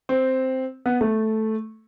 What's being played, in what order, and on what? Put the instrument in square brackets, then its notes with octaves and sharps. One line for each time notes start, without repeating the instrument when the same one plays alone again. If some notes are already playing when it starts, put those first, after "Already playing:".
[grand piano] C4
B3
A3